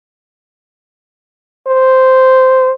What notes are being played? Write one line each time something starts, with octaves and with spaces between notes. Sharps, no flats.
C5